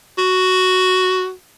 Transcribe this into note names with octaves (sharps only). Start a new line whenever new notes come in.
F#4